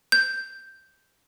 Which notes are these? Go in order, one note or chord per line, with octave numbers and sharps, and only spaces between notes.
G6